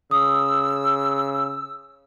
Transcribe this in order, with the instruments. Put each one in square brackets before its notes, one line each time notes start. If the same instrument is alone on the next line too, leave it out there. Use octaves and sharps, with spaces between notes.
[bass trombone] C#3 [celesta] D#6 [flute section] E6